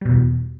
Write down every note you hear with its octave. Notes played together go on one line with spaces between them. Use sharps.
E2 B2 G3